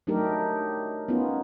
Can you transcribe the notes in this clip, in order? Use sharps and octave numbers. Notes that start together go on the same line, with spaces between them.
F#3 A3 D4 D#4 G4 A#4
B3 C#4 D#4 F4